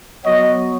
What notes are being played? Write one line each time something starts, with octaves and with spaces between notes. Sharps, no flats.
F#3 B3 F#4 D#5